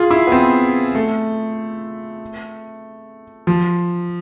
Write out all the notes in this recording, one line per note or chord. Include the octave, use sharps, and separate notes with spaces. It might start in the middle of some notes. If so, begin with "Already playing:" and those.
Already playing: F4 G#4
E4
B3
C4
A3
F3